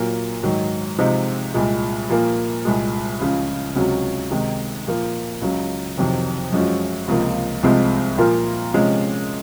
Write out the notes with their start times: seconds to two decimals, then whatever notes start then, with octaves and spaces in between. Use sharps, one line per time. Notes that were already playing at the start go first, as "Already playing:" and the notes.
Already playing: A#2 F#3 A#3
0.43 G#2 D#3 F#3
0.98 C3 F3 G#3 C4 D#4
1.54 C2 A#2 G#3
2.09 A#2 F3 A#3
2.65 C2 A#2 G#3
3.20 C#2 C#3 F3
3.75 C#2 C3 F#3 C#4 F#4
4.31 C3 D#3 G#3 D#4
4.86 A#2 F3 A#3
5.41 C#2 C#3 F#3
5.97 F2 C3 D#3 F#3
6.52 F#2 F3 G#3 C#4 F#4
7.08 C#2 C3 F3 A#3
7.63 C2 C3 F3 G#3 C4
8.18 A#2 F3 A#3 F4 A#4
8.74 C3 F3 G#3 C#4